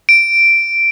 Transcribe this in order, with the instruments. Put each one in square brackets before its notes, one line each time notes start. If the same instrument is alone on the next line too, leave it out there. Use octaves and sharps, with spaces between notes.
[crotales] D7